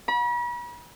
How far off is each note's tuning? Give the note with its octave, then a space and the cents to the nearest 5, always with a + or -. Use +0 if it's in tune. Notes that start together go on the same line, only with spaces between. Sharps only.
B5 -40